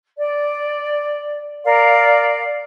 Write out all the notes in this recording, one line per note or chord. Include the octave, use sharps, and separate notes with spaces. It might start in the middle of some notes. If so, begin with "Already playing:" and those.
D5
A#4 D5 F5